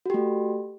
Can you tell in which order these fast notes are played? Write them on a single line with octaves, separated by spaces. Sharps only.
F#4 G4 A3